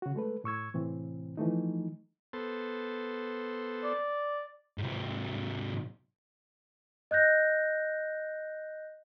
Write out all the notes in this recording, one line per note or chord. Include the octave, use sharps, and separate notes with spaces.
C#3 F#4
G#3 A3 A4 B4
A2 C#6 E6 G#6
A2 C3 E3 C4
E3 F3 A3 D#4
B3 A4 C5
D5
G#2 C3
D#5 F#6 G6 A#6